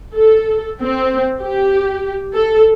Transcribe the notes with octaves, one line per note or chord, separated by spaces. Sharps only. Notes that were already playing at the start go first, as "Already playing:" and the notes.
A4
C4
G4
A4